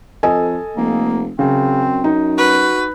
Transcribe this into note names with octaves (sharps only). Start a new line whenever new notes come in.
F2 A4 D#5 G#5
F1 A#3
F#2 C#3 C4
F#2 D#4
F#4 B4